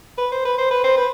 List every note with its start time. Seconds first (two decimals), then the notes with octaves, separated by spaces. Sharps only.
0.18 B4
0.32 C5
0.45 B4
0.58 C5
0.71 B4
0.84 C5
0.97 B4